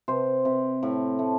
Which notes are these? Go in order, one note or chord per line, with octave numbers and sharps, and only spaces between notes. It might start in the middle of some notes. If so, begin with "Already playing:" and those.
C3 C5
C3
A2
A3